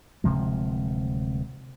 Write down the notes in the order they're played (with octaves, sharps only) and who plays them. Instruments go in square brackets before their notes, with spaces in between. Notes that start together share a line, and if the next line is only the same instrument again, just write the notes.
[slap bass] D1 C3 F3 G#3